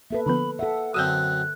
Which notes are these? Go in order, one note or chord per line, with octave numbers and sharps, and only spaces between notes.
A#3 A4 B4 E5
D3 F3 B3 B5
A4 E5 F#5
F#2 D3 C4 D#6 E6 F#6 G6